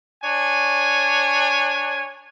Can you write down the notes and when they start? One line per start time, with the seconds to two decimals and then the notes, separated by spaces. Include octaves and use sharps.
0.24 D4 C#5 G#5